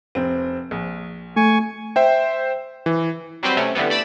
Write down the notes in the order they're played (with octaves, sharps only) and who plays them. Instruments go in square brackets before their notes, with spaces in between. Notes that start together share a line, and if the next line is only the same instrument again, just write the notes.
[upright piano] F1 C4
A#1
[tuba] A3 [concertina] G#5 C#6
[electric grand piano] C5 E5 G5
E3
[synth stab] F#3 G3 C4 B4 C5
C3 A3 C#4
D3 E3 G3 B3
A3 D5 B5 E6 E7